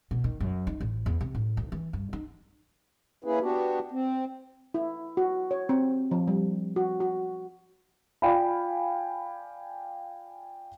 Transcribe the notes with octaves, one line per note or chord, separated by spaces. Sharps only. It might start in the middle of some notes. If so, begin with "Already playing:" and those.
B2
D#3
F#2
D#4
A1
E2
C3
A2
D2
E3
G2
D#4
A#3 C#4 E4 G#4 B4
B3 D4 F#4 G4
C4
E4
F#4
C#5
C4
F3
G3
F#4
F#4
F4 D5 F5 G5 G#5 B5